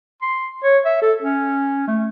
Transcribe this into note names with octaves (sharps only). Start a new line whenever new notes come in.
C6
C#5
E5
A4
C#4
A3